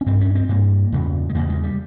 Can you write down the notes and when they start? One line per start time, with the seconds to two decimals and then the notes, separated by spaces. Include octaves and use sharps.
0.01 C#4
0.06 G2 C4
0.21 C#4
0.35 C4
0.49 G2 A#3
0.92 E2 C#3
1.29 G#3
1.34 E2 C#3 A#3
1.49 G#3
1.63 G3